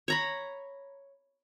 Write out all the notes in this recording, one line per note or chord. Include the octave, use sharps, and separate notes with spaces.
C#5 A#5 B5